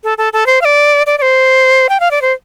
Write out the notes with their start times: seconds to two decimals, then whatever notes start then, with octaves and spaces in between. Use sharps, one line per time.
0.04 A4
0.18 A4
0.33 A4
0.46 C5
0.61 F5
0.65 D5
1.06 D5
1.18 D5
1.22 C5
1.89 G5
2.00 F5
2.11 D5
2.22 C5